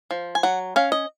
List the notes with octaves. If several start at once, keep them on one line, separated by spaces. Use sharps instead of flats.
F3
G#5
F#3 F#5
C#4 F5
D#5